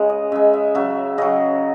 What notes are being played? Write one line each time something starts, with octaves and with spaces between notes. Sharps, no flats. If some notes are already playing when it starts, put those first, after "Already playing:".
Already playing: C#3 G#3
D#5
C#3 G#3 E5
E5
C#3 F#3 E5
C#3 F#3 D#5